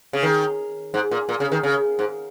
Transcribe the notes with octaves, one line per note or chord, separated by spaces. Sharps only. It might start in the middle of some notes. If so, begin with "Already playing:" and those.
C#3
D#3
G#2
A#2
A#2
C#3
D#3
C#3
G#2